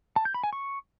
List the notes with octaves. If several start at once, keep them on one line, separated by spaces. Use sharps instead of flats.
A5
G6
B5
G#5
C#6